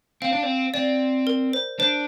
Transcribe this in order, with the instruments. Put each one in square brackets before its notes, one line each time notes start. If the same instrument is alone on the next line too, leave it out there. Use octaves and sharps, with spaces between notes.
[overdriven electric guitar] C4 [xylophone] F5
[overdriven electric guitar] D4
C4
[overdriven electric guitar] C4 [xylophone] D5
[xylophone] A#4
C5
[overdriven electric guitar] D4 [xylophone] C5